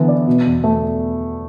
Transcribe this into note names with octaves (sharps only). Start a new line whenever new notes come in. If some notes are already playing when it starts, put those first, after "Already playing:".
Already playing: D3 E3 B3
D5
B2
E2
A3